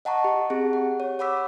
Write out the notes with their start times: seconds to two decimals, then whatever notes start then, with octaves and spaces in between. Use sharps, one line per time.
0.05 D#5 F#5 A5 A#5 C#6
0.24 G4
0.50 C4 G4 G#4
0.73 F#5
1.00 C#5
1.19 C#5 F#5 B5 D6 E6 B6